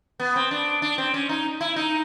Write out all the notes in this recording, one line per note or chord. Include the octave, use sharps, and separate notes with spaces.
B3
C4
D4
D4
C4
C#4
D#4
E4
D#4